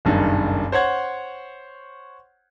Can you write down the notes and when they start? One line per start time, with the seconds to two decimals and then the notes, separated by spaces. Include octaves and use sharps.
0.05 F#1 B1 G2 D#3
0.72 C5 C#5 F#5 G#6